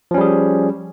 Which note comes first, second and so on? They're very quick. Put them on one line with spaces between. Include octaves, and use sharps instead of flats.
F3 C#4 G3 G#4